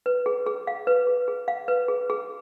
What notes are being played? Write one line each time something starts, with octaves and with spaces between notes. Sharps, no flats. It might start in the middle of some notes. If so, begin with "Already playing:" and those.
B4
G#4
G#4
F5
B4
G#4
G#4
F5
B4
G#4
G#4